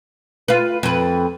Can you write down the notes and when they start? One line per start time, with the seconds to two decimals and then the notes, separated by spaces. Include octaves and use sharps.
0.48 F4 B4
0.83 F2 B4